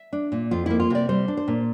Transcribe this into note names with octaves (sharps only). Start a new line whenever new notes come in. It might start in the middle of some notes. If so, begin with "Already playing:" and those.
Already playing: E5
D4
A#2
F2 F4
A#3 E4
F4
C3 D5
G3 C5
D4
C5
A#2